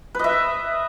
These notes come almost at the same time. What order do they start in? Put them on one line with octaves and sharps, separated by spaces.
B4 D#5 E5